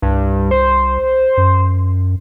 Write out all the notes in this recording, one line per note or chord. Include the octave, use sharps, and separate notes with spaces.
C2 G2
C5
F#2